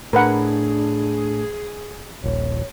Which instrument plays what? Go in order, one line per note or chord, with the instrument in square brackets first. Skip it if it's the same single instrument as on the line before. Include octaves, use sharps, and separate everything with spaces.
[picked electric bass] A2 [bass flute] D4 [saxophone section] G#4 [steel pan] A#4 B4 F#5
[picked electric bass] D#1 A#1 [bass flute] C#5